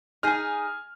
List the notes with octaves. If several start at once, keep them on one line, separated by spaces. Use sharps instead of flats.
D#4 G#4 G#5 F6